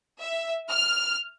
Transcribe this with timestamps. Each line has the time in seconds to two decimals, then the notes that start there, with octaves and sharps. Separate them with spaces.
0.20 E5
0.70 F6